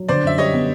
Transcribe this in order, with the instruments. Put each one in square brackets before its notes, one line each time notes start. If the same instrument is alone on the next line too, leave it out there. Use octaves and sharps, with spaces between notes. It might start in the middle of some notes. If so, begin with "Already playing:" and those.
Already playing: [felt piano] F#3
[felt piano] D3 [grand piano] C5 D5
[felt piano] F#2 [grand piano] E5
[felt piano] G3 [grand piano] C#5 D#5
[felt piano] B3